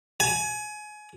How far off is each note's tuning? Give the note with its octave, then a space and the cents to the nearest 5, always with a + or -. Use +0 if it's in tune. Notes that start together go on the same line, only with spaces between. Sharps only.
G#5 +25